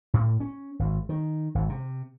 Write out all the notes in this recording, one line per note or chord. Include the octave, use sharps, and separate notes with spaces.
A2
C#4
G#1
D#3
G#1
C3